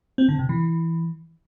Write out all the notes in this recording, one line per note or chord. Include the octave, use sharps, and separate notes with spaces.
C4
D3
C3
E3